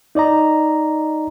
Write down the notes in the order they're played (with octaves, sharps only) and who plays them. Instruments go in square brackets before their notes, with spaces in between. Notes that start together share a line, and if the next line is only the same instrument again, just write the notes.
[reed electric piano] D#4 D5 D#5 A#5